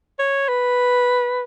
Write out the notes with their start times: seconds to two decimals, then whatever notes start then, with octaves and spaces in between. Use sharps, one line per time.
0.19 C#5
0.49 B4